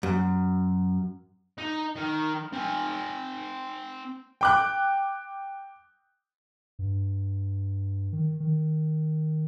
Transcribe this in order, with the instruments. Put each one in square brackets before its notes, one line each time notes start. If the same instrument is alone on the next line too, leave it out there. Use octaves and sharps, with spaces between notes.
[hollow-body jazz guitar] F#2
[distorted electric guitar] D#4
D#3
C4 G#5
[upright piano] G5 D6 F#6
[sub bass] G2
D#3
D#3